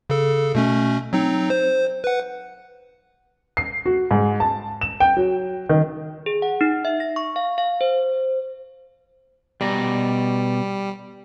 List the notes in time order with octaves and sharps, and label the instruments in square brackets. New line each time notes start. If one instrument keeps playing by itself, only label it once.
[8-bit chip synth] C#3 A4
B2 A3 C#4
F#3 C4 D#4
C5
B4 F#5
[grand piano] C7
F#4
G#2
A5
E7
G5
F#3
D#3
[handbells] G#4
F#5
D#4
E5
A#6
C#6
F5
F5
C5
[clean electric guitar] B2 D5 A#5 [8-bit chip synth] G3